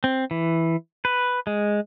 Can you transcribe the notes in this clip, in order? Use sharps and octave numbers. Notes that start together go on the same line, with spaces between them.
C4
E3
B4
G#3